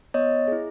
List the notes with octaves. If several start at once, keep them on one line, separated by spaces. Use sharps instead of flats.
B3 C#5 D#5
E4 G#4